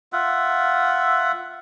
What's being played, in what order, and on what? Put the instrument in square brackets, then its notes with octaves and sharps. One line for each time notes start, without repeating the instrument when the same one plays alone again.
[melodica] F4 E5 F#5